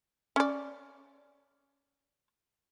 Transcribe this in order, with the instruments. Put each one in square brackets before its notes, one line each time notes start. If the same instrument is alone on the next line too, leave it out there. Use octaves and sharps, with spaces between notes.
[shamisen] C#4 D5